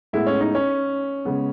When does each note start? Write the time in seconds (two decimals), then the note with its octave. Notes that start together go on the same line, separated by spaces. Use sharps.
0.13 A2 G#3 B3 E4
0.27 C#4
0.41 D#4
0.55 C#4
1.25 C#3 G#3 B3